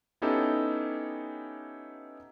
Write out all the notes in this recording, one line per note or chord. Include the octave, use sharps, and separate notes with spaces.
B3 C#4 D#4 E4 G4 A4